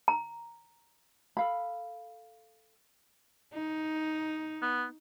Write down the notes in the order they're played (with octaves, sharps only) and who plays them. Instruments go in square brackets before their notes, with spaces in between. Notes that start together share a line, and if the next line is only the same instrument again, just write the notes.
[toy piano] A#5
[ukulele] A4 F5 B5
[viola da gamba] D#4
[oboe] B3